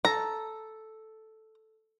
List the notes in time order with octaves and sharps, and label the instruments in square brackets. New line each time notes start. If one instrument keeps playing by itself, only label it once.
[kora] A4 [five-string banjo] A#5